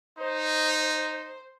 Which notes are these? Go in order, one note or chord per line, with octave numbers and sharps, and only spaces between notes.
D#4 C5